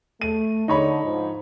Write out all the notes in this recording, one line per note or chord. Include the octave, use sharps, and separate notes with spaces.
A3 D#7
D3 D#4 C#5 B5
G#2 F3